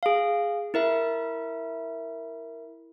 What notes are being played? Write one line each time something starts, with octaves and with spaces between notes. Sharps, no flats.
G#4 F5
E4 A#4 E5